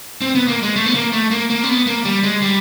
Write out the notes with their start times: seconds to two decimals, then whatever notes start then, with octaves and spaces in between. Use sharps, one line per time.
0.21 C4
0.35 B3
0.48 A#3
0.63 G#3
0.76 A3
0.86 B3
0.95 A#3
1.13 A3
1.31 A#3
1.50 A#3
1.64 C4
1.69 B3
1.87 A#3
2.05 G3
2.23 G#3
2.42 G3